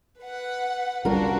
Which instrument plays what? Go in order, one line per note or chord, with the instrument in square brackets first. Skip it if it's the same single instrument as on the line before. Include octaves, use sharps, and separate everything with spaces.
[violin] B4 F#5
[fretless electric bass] C2 G3 C#4 [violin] D4 F#4 [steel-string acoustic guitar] F4 A#4